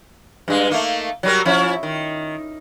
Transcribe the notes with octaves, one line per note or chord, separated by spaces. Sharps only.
G2 G#3
A3 A#3 D#4
F#3 G3 A#4
F3 C#4 E4
D#3